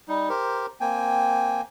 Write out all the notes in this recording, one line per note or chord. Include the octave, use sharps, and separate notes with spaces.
G3 D#4
G4 A#4 C5
A#3 C4 G5 G#5